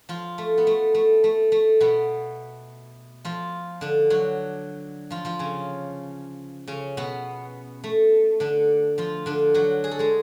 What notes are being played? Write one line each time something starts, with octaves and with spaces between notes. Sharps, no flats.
F3 F4
A3
B3
A3
A3
A3
A3
B2 B3
F3 F4
D3 D4
F#3 F#4
F3 F4
F3 F4
C#3 C#4
C#3 C#4
B2 B3
A3
D3 D4
F3 F4
D3 D4
F#3 F#4
G#4
A4
G#3 G#4